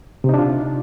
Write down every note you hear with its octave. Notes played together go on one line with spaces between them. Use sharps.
C3 D4 D#4 F4